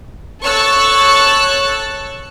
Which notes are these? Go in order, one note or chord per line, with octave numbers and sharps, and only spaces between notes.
A4 C#5 C#6 E6 F#6 A6